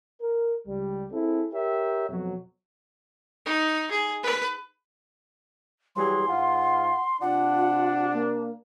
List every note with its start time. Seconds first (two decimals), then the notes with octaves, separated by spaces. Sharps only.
0.21 A#4
0.67 C#2 G3
1.12 C4 E4 G#4 A4
1.53 G4 A#4 C#5 E5 G5
2.09 F2 B2 F3 F#3
3.46 D#4
3.91 G#4
4.23 B4
5.96 E3 F#3 G3 G#4 C6
6.28 G#2 F4 F#5
7.21 C3 D4 F4 F#5
8.13 A#3